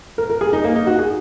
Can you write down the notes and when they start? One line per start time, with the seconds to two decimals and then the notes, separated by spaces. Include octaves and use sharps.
0.18 A#4
0.30 A#4
0.41 G#4
0.53 D#4
0.64 A#3
0.76 D#4
0.87 F#4
0.99 G#4